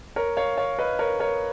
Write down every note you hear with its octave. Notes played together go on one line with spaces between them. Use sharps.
A#4 C#5
C#5 F5
C#5 F5
B4 D#5
A#4 C#5
A#4 C#5